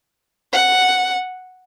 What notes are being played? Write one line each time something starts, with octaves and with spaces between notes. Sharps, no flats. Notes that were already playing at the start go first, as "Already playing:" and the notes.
F#5